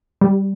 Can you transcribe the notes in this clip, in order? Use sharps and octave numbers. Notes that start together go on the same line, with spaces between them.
G3